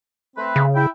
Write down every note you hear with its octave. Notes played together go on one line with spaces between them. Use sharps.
A3 C4 B4
C#3
E4 G5